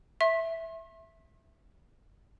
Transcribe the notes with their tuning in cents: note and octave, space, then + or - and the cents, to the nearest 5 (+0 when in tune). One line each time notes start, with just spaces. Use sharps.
E5 +0 C6 +45